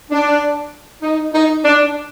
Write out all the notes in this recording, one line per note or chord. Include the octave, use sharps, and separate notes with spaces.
D4
D#4
D#4
D4